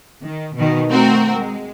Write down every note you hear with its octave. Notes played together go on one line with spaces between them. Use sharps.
D#3
B2 D#3
A3 C4 F#4 A#4
G#3